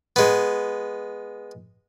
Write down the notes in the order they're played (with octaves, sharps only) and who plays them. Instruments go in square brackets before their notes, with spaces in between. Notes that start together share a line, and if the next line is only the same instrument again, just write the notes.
[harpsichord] G#3 B3